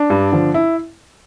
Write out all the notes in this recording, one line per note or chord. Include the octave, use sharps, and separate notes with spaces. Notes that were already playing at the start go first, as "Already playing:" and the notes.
Already playing: D4
G2
D3 F3
E4